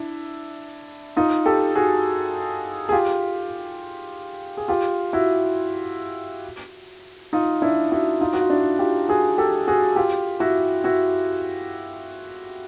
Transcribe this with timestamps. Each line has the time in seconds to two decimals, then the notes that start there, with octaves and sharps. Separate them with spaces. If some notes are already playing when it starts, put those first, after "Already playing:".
Already playing: D4 E4
1.17 D#4 F4
1.46 G4 A4
1.75 F#4 G#4
2.89 G#4
2.92 F4 G4
4.57 G#4
4.68 F4 G4
5.13 E4 F#4
7.33 D#4 F4
7.62 D4 E4
7.91 E4 F#4
8.21 D#4 F4
8.33 F#4
8.41 F4
8.50 D4 E4
8.79 F4 G4
9.09 F#4 G#4
9.38 G4 A4
9.67 F#4 G#4
9.96 F4 G4
10.40 E4 F#4
10.84 E4 F#4